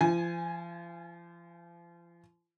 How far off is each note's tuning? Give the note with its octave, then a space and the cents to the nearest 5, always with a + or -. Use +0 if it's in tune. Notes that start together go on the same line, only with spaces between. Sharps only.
F3 -35 G#5 +0